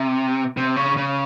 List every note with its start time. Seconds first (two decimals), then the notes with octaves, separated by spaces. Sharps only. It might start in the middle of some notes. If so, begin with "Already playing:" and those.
Already playing: C3
0.57 C3
0.76 C#3
0.97 C#3